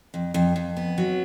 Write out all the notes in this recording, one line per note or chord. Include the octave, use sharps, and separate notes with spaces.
F2
F2
F2
B3
F#3